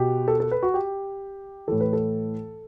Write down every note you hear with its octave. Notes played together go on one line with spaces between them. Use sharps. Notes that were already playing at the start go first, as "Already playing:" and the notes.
Already playing: B2 G4
A4
A4
B4
F#4
G4
A2 E3 A4
B4
A4